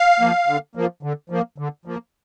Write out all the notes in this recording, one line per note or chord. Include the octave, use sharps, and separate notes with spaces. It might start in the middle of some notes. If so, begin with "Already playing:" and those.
Already playing: F5
F3 A#3
D3
F3 A#3
D3
F3 A#3
D3
F3 A#3